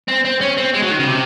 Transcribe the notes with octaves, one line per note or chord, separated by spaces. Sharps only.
C4
C4
C#4
C4
G#3
F#3
D#3
C#3
C3